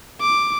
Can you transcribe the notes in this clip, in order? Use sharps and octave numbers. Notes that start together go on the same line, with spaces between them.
D6